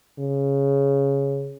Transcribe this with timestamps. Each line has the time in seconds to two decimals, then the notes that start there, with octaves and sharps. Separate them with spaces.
0.19 C#3